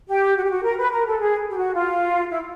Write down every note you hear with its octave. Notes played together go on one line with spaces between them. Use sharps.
G4
F#4
G4
F#4
A#4
B4
A#4
A4
G#4
G4
F#4
F4
E4